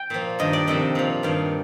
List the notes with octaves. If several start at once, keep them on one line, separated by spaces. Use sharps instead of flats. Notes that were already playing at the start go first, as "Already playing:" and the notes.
Already playing: G5
A#2 F3
G2 D#3 D#5
D5
F2 C3 D#3 D#5
A#2 F3
G2 D#3 F5